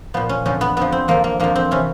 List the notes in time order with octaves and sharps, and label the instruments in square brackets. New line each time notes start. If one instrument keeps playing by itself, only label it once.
[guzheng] A#2 F3 B3
C#4
F2 D3 F3 C#4
B3
F2 D3 F3 B3
C4
F2 D3 F3 A#3
A#3
F2 D3 F3 A#3
C4
C3 E3 C#4